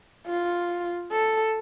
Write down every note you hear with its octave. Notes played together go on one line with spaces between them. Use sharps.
F4
A4